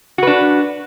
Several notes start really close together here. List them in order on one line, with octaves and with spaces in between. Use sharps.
F#4 B4 D4